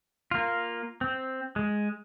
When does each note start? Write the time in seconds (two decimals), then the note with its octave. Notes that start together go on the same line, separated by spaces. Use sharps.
0.31 A#3 F4
1.01 C4
1.56 G#3